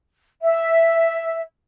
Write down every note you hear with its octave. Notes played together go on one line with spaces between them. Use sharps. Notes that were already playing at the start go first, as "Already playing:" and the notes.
E5